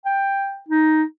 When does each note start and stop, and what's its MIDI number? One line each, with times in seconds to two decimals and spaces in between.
0.06 0.58 79
0.69 1.03 63